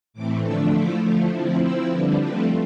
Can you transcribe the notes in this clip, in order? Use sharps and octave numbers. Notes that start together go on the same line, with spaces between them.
A2 E3 A3 C4 D6
D3 F3 A3 D4 E6
F3 A3 E4 D6
D3 F3 A3 F5
F3 C4 E4
F3 C4 E4 E5
D3 G3 D4 B4
F3 A3 C4 B4